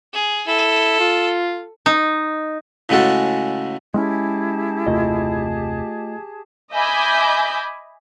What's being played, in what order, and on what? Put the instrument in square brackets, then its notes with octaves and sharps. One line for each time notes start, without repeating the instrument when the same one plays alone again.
[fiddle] G#4
[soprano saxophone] E4 [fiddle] A4
[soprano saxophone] F4
[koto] D#4
[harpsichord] A2 C#3 G#3 F#4 A4
[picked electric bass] G#3 C4 C#4 [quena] E4 [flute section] G4 G#4 A5
[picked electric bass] F#1 D#2 C3 [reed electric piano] A3 F4 D#5
[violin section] D#5 E5 G#5 B5 D6 G6